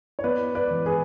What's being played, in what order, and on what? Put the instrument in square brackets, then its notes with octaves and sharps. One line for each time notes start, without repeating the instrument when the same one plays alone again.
[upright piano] C#5
B3 B4 D5
B4 D5
E3
G#4 B4